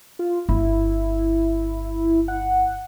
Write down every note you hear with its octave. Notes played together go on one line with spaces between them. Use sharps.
F4
G1 E4
F#5